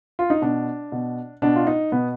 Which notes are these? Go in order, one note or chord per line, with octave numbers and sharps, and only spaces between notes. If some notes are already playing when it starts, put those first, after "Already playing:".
F4
D#4
B2 D4
B2
B2 D4
F4
D#4
B2 B3